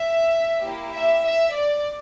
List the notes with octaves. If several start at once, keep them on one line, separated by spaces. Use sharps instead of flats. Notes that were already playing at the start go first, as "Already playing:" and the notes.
Already playing: E5
A#3 E4 G4
E5
E5
D5